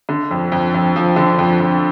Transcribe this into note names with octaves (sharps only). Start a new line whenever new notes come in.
D3
F2
F2
F2
F3
D3
F2
F2